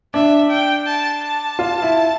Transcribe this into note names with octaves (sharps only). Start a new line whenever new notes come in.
D4 E5
G5
A5
A5
F4
E4